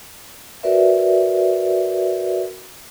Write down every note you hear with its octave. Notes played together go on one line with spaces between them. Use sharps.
F#4 A#4 B4 D5 E5